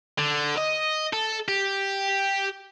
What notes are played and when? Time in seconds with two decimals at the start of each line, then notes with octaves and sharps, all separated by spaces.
0.18 D3
0.57 D#5
1.13 A4
1.48 G4